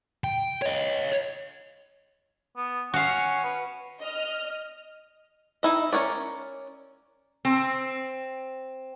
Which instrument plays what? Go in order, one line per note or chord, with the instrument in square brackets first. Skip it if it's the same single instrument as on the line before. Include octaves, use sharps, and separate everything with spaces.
[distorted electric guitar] G5
C#5 D#5
[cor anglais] B3
[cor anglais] C#4 [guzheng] F#4 F5
[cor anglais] B4
[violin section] D#5 F6
[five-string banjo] D#4 E4 D#5
C#4 A#4 C#5 D5
[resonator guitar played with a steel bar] C4